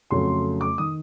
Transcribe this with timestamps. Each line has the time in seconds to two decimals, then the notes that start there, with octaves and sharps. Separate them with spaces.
0.11 F2 C#3 F#3 A3 C6
0.61 D6
0.78 D#3 D#6